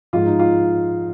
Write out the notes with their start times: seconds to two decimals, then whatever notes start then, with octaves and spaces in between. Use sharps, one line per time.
0.13 G#2 F3 F4
0.26 D#4
0.39 F4